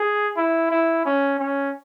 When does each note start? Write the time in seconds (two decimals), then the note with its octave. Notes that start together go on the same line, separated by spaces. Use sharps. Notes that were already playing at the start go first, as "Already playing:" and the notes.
Already playing: G#4
0.36 E4
0.71 E4
1.05 C#4
1.39 C#4